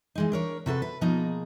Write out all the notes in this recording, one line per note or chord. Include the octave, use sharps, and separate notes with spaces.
E3 G#3 D#4
D4 A#4 C#5
C3 F#4 A4 B4
B4
B2 F3 A#3 D#4 G#4